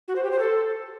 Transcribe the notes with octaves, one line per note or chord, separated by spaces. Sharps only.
F#4
C5
G4
C5
A4